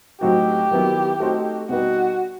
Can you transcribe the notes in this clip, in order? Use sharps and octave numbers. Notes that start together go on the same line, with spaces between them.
A2 F#3 C4 D#4 F#4 G4
D#3 F#3 B3 E4
A3 C4 D#4 F#4 C5
B2 G3 D#4 F#4 G4 B4